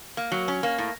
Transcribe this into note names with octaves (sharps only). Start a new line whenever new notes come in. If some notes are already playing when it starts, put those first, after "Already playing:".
A#3
F#3
C#4
A#3
A2